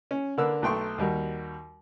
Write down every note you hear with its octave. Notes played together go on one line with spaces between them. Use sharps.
C#4
D3 A#3 D4 A#4 B4 E6
B1 A3 G5 C6 C#6
D#2 G3 F#4 A#4